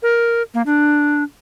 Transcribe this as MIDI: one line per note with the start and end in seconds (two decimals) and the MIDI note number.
0.03 0.42 70
0.54 0.62 58
0.66 1.23 62